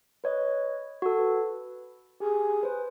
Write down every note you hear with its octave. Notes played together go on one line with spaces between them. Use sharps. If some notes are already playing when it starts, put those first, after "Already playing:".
B4 C#5 D#5
F#4 A4
B4
G4 G#4
B4 C5